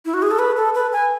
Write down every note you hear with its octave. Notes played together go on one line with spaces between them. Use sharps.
E4
F#4
G#4
A4
B4
A4
B4
G#5